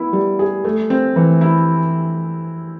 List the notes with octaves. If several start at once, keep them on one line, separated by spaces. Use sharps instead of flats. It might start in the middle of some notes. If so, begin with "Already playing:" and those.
Already playing: B3 E4
G3
G#4
A3
C4
E3
E4